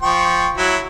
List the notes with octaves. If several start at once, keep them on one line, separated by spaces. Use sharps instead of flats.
F3 G5 C#6
F#3 E4